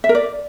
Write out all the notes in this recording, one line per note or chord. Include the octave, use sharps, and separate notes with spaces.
E5
A#4
D5